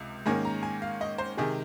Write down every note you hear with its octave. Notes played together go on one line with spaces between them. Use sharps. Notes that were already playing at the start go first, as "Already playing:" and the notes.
Already playing: C#2 C3
G#2 D#3 A#3 C#4 G#5
A#5
G#5
F5
D#5
C5
C3 D#3 G#3 G#4